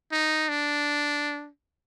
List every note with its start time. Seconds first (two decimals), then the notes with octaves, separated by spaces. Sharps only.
0.12 D#4
0.49 D4